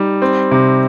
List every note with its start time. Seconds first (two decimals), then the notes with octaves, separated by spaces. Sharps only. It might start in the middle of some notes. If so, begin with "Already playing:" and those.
Already playing: G3 D#4
0.22 C4
0.51 C3